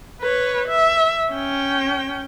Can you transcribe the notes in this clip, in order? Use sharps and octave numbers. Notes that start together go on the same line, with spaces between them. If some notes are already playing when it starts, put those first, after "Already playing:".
B4 C#5
E5
C#4 G5